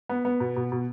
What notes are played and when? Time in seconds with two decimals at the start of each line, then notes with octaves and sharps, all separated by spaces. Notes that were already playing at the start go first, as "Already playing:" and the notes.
0.09 B3
0.25 B3
0.40 B2
0.56 B2
0.72 B2